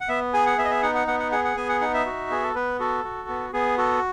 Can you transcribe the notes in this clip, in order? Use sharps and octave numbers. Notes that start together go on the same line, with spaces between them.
F#5
B3 E5
G#4 G#5
F#5
B3 E5
D#5
E5
D#4 F#5
F#5
B3 F#5
F#5
G#4 F#5
F#5
B3 G#5
F#5
D#4 F#5
E5
F#4
B3 G#4
A4
B3 B4
F#4 A4
F#4
B3
B3 G#4
F#4 A4